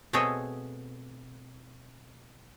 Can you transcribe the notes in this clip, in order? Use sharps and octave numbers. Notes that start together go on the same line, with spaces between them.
B2 A3 C4 G#4 C#5 D#5